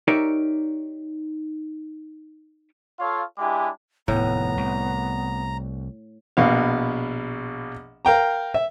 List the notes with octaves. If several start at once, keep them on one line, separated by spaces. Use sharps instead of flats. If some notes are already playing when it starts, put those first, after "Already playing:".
D#4 G4 A#4 C#5 D5 E5
F4 A4 C#5 F5
G#3 D4 E4 G4 G#5 D6
F1 D#2 A2 B3 A#5
C2
A#1 B2 F5
A#4 F5 G5 A#5
E5